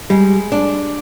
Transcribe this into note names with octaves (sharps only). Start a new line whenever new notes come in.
G3 G#3
D4